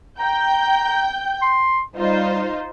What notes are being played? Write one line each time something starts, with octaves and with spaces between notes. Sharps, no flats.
G5 A#5 G6
C6
G3 D#4 F4 C5